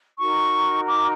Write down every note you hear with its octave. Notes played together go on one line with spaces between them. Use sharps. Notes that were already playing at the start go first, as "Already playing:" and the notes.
D#4 F#4 A#4 C#6
D6